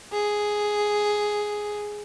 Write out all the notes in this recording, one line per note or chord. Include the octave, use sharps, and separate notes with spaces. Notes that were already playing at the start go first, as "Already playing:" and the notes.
G#4